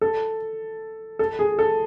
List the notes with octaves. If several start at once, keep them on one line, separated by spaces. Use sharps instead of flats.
A4
A4
G#4
A4